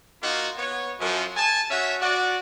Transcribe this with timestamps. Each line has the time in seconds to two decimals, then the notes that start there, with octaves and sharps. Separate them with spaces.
0.23 A#3 D#4 F4 F#4
0.58 B3 C#5
1.00 F#2 F3
1.37 G#5 A5
1.70 C#4 F#4 E5
2.01 F#4 D5